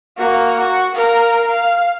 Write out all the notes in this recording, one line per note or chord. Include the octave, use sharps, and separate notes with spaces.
A#3 F#4
F#4
A#4 F5
F5